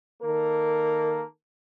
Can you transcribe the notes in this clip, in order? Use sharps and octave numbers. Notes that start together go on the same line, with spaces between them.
D#3 A#3 A4 A#4